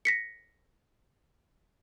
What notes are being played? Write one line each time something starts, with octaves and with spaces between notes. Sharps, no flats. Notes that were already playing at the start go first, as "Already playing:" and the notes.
A#6 B6 C#7